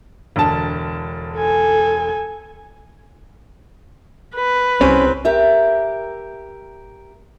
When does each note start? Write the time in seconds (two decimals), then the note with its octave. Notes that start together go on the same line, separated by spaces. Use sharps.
0.36 E1 D3 A5
1.36 A4 G#5
4.35 B4
4.81 C2 C4 C#4
5.25 G4 A#4 E5